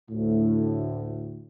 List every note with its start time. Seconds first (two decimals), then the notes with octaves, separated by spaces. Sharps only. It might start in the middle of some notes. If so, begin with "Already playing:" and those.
0.11 D2 A2